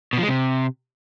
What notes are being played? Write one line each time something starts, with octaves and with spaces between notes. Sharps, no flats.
B2
F3
G#3
C3